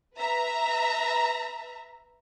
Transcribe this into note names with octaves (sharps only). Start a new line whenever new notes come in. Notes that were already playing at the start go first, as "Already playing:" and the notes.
B4 E5 A#5